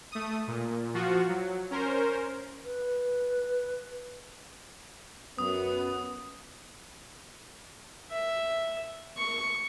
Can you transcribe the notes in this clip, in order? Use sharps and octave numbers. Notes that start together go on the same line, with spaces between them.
A3 D#6
A#2
F3 F4 F#4
F#3
C#4 A#4 C5
B4
F#2 B3 D#6
E5
C#6